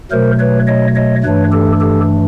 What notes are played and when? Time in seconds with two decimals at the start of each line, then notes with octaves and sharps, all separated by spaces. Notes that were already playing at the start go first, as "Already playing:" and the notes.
0.11 B2 F#3 A3 A#4 C5
0.39 B4 C#5
0.67 C#5 D#5
0.95 C#5 D#5
1.24 G2 E3 A3 D4 B4 C#5
1.52 G4 A4
1.81 G4 A4